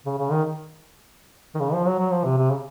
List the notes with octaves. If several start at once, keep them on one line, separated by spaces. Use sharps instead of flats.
C#3
C#3
D#3
D#3
C#3
F3
F#3
F#3
F3
C3
C3
C#3